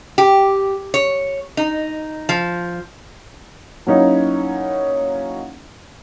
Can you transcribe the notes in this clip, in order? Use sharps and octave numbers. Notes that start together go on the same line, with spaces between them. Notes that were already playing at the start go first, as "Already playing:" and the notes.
G4
C#5
D#4
F3
F#3 A#3 C#4 D#4 E4